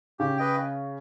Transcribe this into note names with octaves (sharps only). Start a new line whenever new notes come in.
C#3 G4
B4 D#5 G5